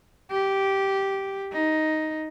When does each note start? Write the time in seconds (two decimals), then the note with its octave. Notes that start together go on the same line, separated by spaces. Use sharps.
0.31 G4
1.53 D#4